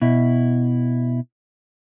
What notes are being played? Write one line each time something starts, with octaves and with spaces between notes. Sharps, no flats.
B2 E4